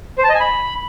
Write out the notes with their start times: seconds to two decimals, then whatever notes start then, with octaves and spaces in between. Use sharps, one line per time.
0.18 C5
0.24 A5
0.29 D#5
0.35 G#5
0.40 B5